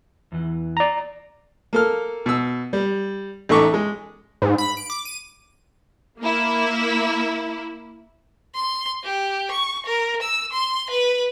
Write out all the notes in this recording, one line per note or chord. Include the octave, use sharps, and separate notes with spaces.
E2 E3
D5 A#5
A#3 A4 F6
B2 E6
G3
A1 A3 D#4 C#6 D6
G#3
G#2
B5
D7
D6
D#7
A#3 E4
C6
G4
C#6
A#4
E6
C6
B4